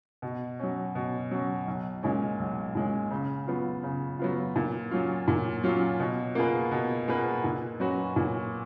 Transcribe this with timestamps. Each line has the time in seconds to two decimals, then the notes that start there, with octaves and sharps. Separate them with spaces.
0.22 B2
0.59 F#3 C#4
0.95 B2
1.31 F#3 C#4
1.67 B1
2.03 A#2 G#3 C#4
2.39 B1
2.75 A#2 G#3 C#4
3.11 C#3
3.47 F#3 B3 F4
3.83 C#3
4.19 F#3 B3 F4
4.56 A#2
4.91 F#3 C#4 F4
5.28 A#2
5.64 F#3 C#4 F4
6.00 B2
6.35 A#3 F4 G#4 B4
6.72 B2
7.08 A#3 F4 G#4 B4
7.44 A#2
7.80 F#3 C#4 F#4 B4
8.16 A#2